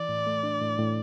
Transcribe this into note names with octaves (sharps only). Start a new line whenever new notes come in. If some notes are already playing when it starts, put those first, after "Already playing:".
Already playing: E3 D5
A2
A3
D4
A2
A2